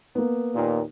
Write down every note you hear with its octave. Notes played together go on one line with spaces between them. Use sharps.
A#3 B3
D#2 A#2